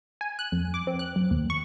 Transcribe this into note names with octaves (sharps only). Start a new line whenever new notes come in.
G#5
F#6
F2
D6
C4
F#6
F#2
D#2
C#6